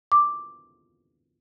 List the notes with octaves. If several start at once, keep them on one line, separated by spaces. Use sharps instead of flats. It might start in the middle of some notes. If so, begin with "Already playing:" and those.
D6